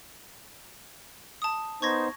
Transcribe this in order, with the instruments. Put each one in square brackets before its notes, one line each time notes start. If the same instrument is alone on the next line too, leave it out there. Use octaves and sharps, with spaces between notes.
[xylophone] A5 D#6
[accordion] B3 D#4 C5 [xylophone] C#6 G#6 A#6